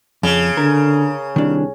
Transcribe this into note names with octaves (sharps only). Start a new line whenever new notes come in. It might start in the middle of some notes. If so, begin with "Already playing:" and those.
F2 C#3
D3 A#4
C2 D#3 D4